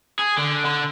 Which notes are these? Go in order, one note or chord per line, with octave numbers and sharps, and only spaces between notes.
G#4
D3
D3